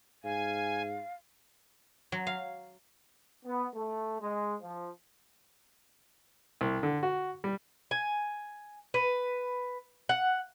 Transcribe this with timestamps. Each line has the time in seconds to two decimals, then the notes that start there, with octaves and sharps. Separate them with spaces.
0.24 G#2 F5 G#5
2.12 F#3
2.27 F5
3.45 B3
3.74 A3
4.21 G#3
4.61 F3
6.61 C2
6.83 D3
7.03 F#4
7.44 G3
7.91 G#5
8.94 B4
10.09 F#5